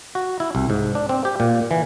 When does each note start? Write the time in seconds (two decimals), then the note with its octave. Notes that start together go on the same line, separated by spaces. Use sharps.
0.15 F#4
0.40 E4
0.55 C2
0.70 G#2
0.95 D4
1.09 C4
1.25 G4
1.40 A#2
1.71 E3